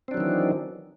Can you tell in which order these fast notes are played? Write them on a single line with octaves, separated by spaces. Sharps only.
C4 D4 F#3 D#3 E3